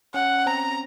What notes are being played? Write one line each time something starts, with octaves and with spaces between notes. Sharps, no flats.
C#4 F#5
C4 A#5